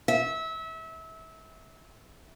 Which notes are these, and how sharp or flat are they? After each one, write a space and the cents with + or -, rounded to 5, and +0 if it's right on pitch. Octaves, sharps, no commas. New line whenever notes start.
E5 -25